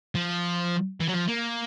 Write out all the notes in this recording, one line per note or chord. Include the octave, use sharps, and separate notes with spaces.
F3
E3
F#3
F3
A#3